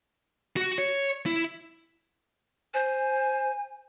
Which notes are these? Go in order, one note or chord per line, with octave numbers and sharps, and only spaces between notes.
F#4
C#5
E4
C5 G#5